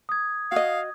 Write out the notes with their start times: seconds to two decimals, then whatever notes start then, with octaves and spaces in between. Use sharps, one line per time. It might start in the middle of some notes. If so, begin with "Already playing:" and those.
0.09 D#6 G#6
0.52 F#4 D#5 F5